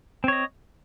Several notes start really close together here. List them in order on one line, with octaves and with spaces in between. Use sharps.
C4 C#5 D#5